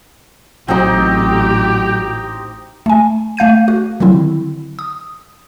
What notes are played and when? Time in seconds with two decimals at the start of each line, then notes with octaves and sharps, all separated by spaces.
0.68 A1 F#3 C4 D#4 F#4 G4
2.86 A3 G#5
3.37 A3 F5 G6 D#7
3.68 F#4
4.00 D3 D#3 F#3 C4 E4
4.79 D#6